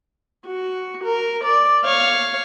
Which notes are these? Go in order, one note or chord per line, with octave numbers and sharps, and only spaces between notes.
F#4
A#4
D5
C#5 F5